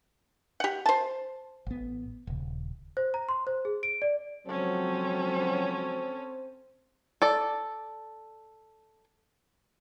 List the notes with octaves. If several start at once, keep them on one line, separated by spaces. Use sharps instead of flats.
G4 F#5
C5 A5
A1 B3
D#1 C#3
C5
A#5
C6
C5
G#4
D7
D5
C#2 F3 F#3 C4 C#4 A4 C5
A4 D5